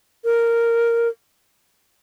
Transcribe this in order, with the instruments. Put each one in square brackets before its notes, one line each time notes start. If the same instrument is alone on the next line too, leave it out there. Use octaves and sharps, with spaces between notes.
[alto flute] A#4